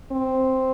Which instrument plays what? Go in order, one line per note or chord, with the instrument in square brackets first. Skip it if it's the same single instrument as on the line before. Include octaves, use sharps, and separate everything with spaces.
[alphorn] C4